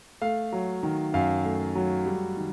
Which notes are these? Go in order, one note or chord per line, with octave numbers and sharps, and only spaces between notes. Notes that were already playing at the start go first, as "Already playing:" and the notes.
A3 F5
F#3
D#3
F#2 F5
A3
F#3
G3
D#3